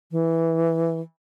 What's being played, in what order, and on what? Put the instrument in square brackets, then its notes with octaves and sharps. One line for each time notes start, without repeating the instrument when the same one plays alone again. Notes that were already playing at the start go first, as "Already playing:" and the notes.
[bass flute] E3